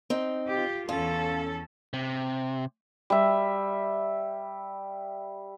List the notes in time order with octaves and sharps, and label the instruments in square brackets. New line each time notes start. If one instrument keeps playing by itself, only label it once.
[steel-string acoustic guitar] C4 D#4
[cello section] F4 G4
[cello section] E2 C#4 A4 [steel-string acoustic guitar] F4
[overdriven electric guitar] C3
[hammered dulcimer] G3 E5